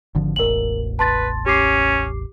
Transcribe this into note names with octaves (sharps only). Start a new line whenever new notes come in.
G#1 D3 F3
E1 A1 A#4 F#7
B4 A5 C6 A6
C#4 G4 D6 C7